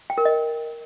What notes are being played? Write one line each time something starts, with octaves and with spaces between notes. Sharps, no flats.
G5
A#4
D#5